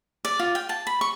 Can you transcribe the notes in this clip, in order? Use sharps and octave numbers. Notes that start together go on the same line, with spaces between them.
D5
F4
G5
A5
B5
C#6